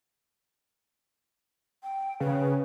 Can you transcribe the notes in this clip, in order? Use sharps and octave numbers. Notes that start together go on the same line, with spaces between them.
G5
C#3 B4